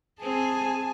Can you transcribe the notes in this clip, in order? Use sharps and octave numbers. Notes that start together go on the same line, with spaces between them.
C4 G#4 G#5 A5